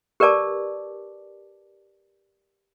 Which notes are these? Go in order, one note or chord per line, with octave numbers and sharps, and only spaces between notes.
G4 A#4 B4 D5 A5 D6